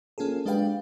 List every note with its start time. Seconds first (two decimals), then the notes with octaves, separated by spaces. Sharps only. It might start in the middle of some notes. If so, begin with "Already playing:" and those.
0.18 A#3 C#4 F4 G#4 A4
0.46 G#3 D4 G4 B4 F5 G5